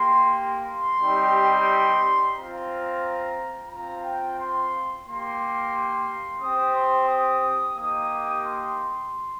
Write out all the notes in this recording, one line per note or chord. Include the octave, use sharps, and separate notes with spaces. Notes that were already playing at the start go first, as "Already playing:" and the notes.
Already playing: A#3 G4 C6
C6
G3 C4 D#4 G4
C4 F4 A#5
C4 F4 A#5
G5
C6
A#3 G4 C6
C4 G4 D#6
C6
D#6
A#3 D#4 G4 D#6
C6